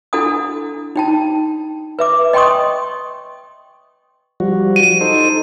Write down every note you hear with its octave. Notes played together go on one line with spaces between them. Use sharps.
D4 E4 A4 F#5 G#5 D#6
D#4 G5 A5
B4 E5 D6
D#5 G5 G#5 C6 C#6 D#6
F3 G3 F#4
D#7
D#4 A4 C5